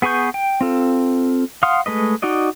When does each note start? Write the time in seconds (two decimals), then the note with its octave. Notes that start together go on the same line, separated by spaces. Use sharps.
0.02 B3 G#4 B4 C#6 G6
0.34 G5
0.61 C4 F4 A4
1.63 F5 F#5 C6 D#6 F6
1.86 G#3 A3 B4 D#5
2.22 D#4 F#4 D5 D#5